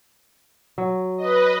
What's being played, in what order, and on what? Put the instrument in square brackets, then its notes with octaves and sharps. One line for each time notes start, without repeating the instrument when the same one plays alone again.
[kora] F#3
[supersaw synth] B4 D#5